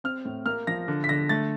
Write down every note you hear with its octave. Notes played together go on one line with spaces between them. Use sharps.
C4 F6
A2
A#3 F6
F3 A#6
D3
B6
D3 A#6
A3 A6